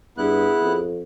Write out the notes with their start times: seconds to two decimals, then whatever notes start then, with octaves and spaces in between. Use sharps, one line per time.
0.18 G2 B3 E4 G#4 F#6
0.62 F2